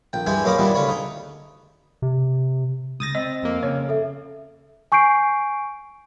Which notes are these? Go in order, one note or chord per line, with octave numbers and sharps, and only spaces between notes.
A#1 G5
G2 E3 G#3 G5 G#5
F#2 A#3 C#4 D#5 B5 D6
A#2 E3 G3 B3 D4
D2 C#3 C#5 B5
D#4
C3
C#2 D#6 A6 A#6
C4 D#5
F2 A#3
C#3 C#5
A4 E5
G#5 C#6 G6 C7 D7